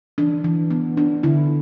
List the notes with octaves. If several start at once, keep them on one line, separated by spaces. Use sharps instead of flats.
E3 D4
E3
B3
D4
D3 E4